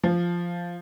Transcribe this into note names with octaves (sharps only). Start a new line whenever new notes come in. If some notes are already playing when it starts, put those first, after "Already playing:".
F3